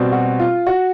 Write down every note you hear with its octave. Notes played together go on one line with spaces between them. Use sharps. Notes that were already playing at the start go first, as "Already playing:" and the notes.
Already playing: B2 G3 C4
F#4
F4
F#4